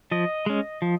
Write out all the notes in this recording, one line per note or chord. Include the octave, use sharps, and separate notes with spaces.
F3 D#5
G#3 C#4
F3